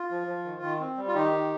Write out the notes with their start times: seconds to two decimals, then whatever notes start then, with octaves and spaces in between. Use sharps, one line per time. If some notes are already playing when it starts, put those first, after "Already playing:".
Already playing: F4
0.11 F3
0.28 F3
0.45 D#3
0.62 D#3
0.80 C4
0.97 G3
1.08 F4
1.14 D#3 D#4 G4
1.32 D#3